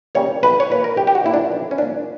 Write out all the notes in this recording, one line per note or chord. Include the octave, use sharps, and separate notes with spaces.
C#3 G3 A#3 C#5
B1 B4
C#5
A#2 A#3 B4
A#4
B1 G4
G4
F#4
A#2 A#3 E4
D4
B1
C#4
A#2 A#3 D4